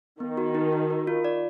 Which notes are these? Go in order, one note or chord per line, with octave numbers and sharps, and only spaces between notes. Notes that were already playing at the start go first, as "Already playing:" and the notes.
D#3 B3
F#4
D#4
F#4
A#4
F4
D5